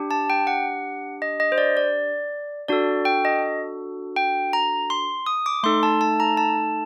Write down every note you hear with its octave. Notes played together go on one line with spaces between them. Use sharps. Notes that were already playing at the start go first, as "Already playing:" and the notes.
Already playing: D4 G4
A5
G5
F#5
D#5
D#5
C5
D5
D5
D4 F#4 A4 D5
G5
D#5
G5
A#5
C6
D#6
D6
A3 D#4 A4 C6
A5
A5
A#5
A5